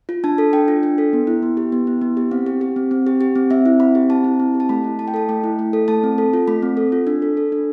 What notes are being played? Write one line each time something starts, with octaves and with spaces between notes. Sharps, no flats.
F4
D4 A5
A4
D4 G5
F4
D4
A4
B3
E4
B3
G4
B3
E4
B3
G4
C4 F5
G4
G4
C4
C4
G4
G4
C4
C4 E5
E4
C4 B5
G4
C4 A5
E4
C4
G4
A5
A3 B5
E4
A3 A5
G5
A4 A5
A3 G5
E4
A3
A4
A3 A5
C4
A4
F4
A3 B5
C4
A4
F4
D4
A4
A4
D4